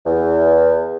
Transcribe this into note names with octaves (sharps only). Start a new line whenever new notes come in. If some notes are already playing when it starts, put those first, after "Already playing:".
E2